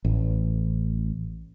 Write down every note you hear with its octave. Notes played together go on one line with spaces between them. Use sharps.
A1